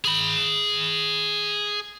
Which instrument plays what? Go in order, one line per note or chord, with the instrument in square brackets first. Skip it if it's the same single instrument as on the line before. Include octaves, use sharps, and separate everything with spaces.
[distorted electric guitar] G#4 B5